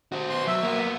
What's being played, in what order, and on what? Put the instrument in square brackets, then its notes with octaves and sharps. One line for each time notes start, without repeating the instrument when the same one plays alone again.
[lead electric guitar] F#4 C5
[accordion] B2 C6
[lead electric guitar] F#3 [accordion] E5
[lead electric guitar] A#3 B3